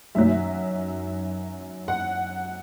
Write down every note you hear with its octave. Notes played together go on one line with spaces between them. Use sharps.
F#2 D#3 F#3 E5
F#5